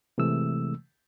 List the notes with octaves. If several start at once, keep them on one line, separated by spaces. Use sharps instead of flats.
C3 E3 G#3 A3 E6